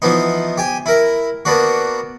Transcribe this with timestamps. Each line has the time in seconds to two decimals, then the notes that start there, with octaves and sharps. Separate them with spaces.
0.02 E3 F3 B3 D#4
0.58 G4 G#5
0.86 E4 A#4
1.45 A#3 B3 D4 F#4